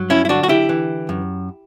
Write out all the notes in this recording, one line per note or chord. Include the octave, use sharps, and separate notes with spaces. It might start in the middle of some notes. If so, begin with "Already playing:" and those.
Already playing: G2 F#3
C#4 E4
E4
D3 D4 F#4
F#4
E4 G4
E3
F#2